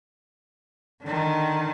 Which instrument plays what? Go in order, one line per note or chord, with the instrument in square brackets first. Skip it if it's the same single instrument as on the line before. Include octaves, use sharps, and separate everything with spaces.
[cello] D3 D#3